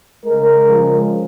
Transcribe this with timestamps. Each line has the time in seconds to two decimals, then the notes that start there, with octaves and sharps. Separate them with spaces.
0.24 C#3 G#3 A#4
0.65 C#3 F3 G#3